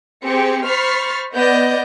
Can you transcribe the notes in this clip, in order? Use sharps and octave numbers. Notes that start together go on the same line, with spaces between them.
C4 G4 G#4 C#7
C5 B5 C#6 F6 A6 C7
B3 D5 D#5 G6